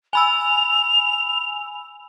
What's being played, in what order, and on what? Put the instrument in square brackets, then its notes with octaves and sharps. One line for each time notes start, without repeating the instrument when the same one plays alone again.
[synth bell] G#5 B5 E6 [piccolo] F7